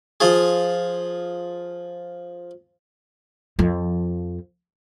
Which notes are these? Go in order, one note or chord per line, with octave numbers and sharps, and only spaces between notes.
F3 F4 G#4
F2 F3